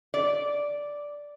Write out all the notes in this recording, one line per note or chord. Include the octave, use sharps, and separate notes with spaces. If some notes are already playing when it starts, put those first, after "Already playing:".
D5